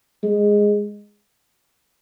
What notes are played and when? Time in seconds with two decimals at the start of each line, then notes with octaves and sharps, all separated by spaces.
0.23 G#3